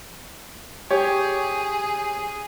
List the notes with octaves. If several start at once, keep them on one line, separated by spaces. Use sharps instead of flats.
G4 G#4 C#5